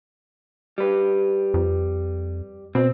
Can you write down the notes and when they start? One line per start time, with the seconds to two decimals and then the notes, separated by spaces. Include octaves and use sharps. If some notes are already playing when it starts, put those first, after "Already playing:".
0.78 G3 B4
1.54 F2
2.75 B2 C4